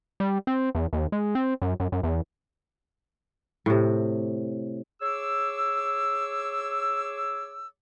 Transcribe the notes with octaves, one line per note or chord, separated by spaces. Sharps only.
G3
C4
E2
D#2
G#3
C4
F#2
F#2
F#2
E2
A2 C3
G#4 C#5 D6 E6